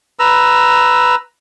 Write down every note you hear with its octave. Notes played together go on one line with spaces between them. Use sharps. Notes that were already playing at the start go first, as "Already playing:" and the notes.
B4 A#5 E6